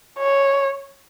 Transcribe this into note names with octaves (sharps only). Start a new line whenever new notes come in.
C#5